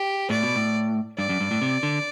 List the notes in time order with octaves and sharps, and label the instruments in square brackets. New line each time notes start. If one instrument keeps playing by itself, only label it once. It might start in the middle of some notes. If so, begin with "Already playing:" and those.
Already playing: [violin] G4
[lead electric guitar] A2 [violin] D5
[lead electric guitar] B2
A2
[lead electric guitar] G2 [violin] D5
[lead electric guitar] F#2
G2
A2
C3
D3